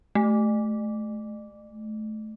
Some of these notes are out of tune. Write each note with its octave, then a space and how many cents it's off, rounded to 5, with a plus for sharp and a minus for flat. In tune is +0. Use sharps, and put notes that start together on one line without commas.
A3 -25